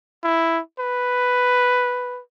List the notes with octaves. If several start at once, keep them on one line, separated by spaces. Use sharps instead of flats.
E4
B4